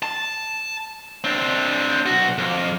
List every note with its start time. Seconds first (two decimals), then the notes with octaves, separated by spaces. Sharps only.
0.03 A5
1.24 C4 D4
2.06 B1 F#4
2.38 F2